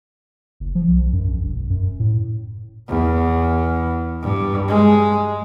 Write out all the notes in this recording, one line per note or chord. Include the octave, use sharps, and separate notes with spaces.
F#1
F3
B1
F#2
A#1
E1
F#2
A2
E2
G2
G#3